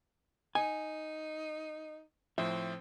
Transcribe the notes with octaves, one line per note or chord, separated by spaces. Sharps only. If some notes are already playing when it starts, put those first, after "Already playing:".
D#4 G#5
A2 F3 C4 E5